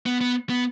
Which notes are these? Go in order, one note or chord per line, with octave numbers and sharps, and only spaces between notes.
B3
B3
B3